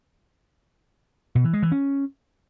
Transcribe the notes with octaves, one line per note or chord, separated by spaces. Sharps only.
B2
E3
G#3
E3
C#4